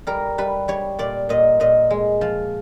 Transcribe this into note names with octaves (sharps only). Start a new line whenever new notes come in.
G3 A#4
G3 B4
G3 C#5
A#2 D5
A#2 D#5
A#2 D#5
G#3
F3